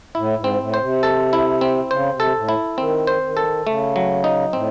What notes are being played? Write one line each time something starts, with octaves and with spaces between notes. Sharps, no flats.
A2 E4
G#2
C4
A2
C5
C3
A4
E4
C4
C#3 C5
C3
A4
A2
E4
D#3 C4
C5
D#3
A4
C#3 A3
F#3
D#4
A2 C4